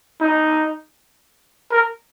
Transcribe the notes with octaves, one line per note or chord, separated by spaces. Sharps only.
D#4
A#4